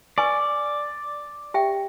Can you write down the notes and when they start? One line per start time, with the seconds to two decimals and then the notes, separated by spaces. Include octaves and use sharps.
0.18 B4 D5 G#5 C#6
1.54 G4 E5 G5